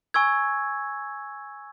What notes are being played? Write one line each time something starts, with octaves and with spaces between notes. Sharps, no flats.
G#5 C#6 E6 G#6